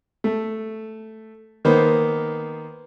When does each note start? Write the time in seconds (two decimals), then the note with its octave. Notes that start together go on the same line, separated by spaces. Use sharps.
0.24 A3
1.65 D#3 A#3 B3 C5